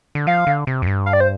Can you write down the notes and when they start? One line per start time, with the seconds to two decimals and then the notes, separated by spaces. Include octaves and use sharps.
0.15 D3
0.27 F3 F5
0.47 D3
0.67 C3
0.82 F2
0.87 G2
1.06 F5
1.13 D5
1.20 C5